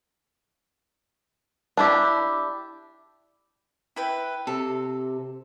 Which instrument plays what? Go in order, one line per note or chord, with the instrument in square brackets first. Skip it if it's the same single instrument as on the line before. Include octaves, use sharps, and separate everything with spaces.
[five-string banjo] D4 E4 G4
[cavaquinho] E4 B4 G5
[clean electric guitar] C3 [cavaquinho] A4